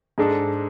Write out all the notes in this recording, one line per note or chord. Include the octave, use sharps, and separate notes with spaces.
G#2 G#3 D4 A4